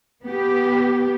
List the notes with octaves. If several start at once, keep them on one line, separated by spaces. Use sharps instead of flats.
B3 G4